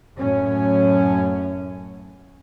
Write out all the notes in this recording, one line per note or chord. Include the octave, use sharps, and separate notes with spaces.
F#2 A2 C#4